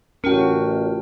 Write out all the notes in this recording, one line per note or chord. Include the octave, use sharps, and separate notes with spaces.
A1 A3 C#4 F4 F#4 A#4 G5